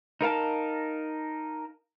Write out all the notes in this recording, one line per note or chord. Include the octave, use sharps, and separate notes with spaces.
D#4 A#4 F5 A5